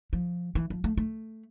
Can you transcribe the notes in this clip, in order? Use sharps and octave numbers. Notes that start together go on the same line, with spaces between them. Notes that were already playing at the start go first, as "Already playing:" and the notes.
F3
E3
F3
A3
A3